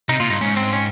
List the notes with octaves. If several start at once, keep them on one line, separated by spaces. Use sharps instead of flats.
C3 D#4
A#2 F4
G2 D#4
G#2 C#4
C4
C#4